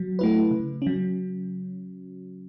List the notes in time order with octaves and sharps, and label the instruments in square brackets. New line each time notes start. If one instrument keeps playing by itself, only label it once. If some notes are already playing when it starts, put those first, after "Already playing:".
Already playing: [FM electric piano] F#3
A3 E4 B4
C#3
F#3 C#4